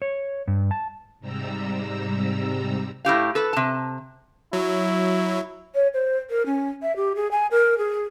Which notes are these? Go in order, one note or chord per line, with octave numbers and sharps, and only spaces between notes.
C#5
G2
A5
G#2 C3 G3 A#5 E6
A2 E4 G4 F5
A4 B4
C3 A5
F#3 E4
C#5
C5
A#4
C#4
E5
G4
G#4
G#5
A#4
G#4